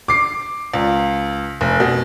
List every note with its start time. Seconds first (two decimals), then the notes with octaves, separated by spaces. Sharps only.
0.08 D6 C7
0.74 C#2
1.61 F1
1.80 B2